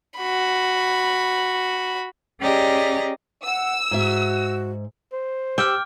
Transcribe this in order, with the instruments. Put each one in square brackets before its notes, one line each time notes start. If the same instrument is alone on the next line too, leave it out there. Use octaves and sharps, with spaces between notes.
[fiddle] F#4 B5
[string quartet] C#4 G4 G#4 D5 D#5 A#5
[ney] F#5 [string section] E6
[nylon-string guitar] G#2 E5 [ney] F#4
[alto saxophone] C5
[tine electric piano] G4 E6 [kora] G5 [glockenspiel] D6 F6